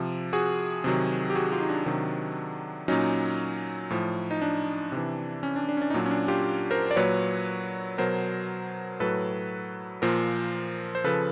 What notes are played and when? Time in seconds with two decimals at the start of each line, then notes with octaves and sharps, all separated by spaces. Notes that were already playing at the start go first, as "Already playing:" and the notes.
Already playing: C3 F3
0.33 F#4 G#4
0.84 C3 D#3 F#3
1.30 G4
1.35 F#4 G#4
1.52 F4 G4
1.61 D#4
1.69 D4
1.86 C3 D#3 F#3
2.88 A#2 F#3 C#4 D#4
3.90 A2 F3
4.31 D#4
4.42 D4
4.92 C3 E3
5.43 C#4
5.56 D4
5.69 D4
5.77 C#4
5.82 D4
5.90 D#4
5.94 A#2 F#3 D4
6.06 C#4
6.11 D4
6.28 F4 G4
6.71 A#4 C5
6.91 D5
6.96 A#2 F#3 B4 C#5
7.98 B2 F#3 A#4 C5
9.00 A2 F#3 A4 B4
10.02 A#2 F3 A#4 C5
10.95 C5
11.04 C#3 F3 A4 B4